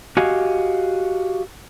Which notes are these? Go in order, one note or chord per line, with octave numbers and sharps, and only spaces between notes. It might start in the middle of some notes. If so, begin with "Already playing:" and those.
F#4 G4 D#5 F5 G#5